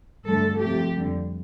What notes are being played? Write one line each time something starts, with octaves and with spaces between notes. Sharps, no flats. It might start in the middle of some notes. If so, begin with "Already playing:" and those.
G2 D3 A3 A4
C3 F3 A3 G4
F2 D3 G3